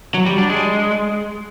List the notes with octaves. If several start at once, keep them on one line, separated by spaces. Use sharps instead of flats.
F#3
G3
D4
G#3